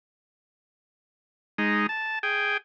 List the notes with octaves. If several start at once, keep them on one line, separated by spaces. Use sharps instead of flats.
G#3 D#4
A5
G#4 G5